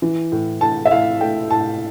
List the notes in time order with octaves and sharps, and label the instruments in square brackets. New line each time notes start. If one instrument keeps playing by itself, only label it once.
[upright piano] E3
A2
A2 A5
E5
A2 F5
A3 G5
A2 A5